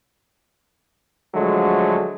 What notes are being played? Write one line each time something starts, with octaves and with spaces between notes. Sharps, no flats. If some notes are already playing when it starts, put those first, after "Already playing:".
D3 F3 F#3 G#3 A3